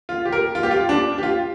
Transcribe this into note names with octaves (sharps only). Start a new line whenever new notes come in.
F4
G4
A#4
F4
G4
F4
D4
G4
F4